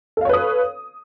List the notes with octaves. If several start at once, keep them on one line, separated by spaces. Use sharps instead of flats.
A4 B4 C#5 F5 D#6